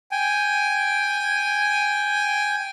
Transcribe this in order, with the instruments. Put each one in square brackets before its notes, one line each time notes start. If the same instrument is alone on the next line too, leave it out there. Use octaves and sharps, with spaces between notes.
[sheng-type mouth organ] G5 G#5